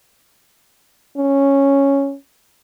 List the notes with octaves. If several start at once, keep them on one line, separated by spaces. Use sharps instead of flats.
C#4